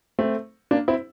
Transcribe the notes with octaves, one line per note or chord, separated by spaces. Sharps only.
A3 C4
A#3 D4
C4 E4